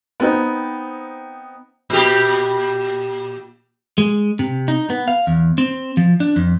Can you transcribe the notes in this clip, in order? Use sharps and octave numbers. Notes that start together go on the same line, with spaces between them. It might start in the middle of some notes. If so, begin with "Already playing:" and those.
B3 C4 D#4
A#2 G4
G#3
C3
D#4
B3
F5
E2
C4
F3
D4
F2